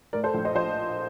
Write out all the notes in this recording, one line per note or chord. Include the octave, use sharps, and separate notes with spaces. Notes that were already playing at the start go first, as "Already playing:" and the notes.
A2 A#4 D5
A4 C5
A#1
C5 D#5
F3 C5 D#5